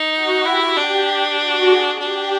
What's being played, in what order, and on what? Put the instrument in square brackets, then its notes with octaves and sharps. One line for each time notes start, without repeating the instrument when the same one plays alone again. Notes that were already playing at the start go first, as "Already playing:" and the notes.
Already playing: [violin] D#4
[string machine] F#4
[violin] E4 [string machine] G4
[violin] D4 [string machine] G4
[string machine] G4
F#4
G#4
[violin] D4 [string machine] G4